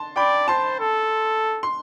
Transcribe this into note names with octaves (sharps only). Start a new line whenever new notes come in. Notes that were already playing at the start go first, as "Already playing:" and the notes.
Already playing: A5 C6
D5 G5 B5
C5 A5 C6
A4
C6